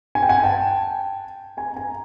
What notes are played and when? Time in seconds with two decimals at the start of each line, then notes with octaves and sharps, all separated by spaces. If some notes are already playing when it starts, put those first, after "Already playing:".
0.15 G#5
0.23 G5
0.29 F#5 G#5
0.44 G5 A5
1.57 G#5 A#5
1.76 G#5 A#5